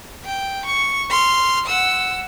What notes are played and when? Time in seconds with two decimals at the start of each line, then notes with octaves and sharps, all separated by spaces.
0.25 G5
0.66 C#6
1.10 C6 F6
1.66 F#5 E6